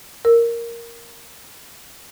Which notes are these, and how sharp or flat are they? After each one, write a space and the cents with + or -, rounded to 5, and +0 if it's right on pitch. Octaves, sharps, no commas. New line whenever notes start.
A#4 +0 E6 +0